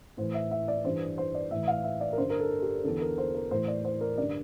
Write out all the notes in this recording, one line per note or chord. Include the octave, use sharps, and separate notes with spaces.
A2 E3 C5
E5
E5
D5
G2 E3 C5
C5
D5
A2 E3 E5
F5
E5
D5
A#4
G2 D3 C5
A#4
A4
G4
E2 D3 A4
A#4
C5
A#4
A2 E3 C5
D5
C5
A#4
G2 D3 D5